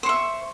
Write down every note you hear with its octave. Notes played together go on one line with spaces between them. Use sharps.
C5 E5 C#6